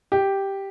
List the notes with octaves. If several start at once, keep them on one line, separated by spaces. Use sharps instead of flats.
G4